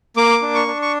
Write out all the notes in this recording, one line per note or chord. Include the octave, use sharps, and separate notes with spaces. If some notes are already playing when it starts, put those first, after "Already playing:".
A#3 D6
D4
C#6
D4
C#6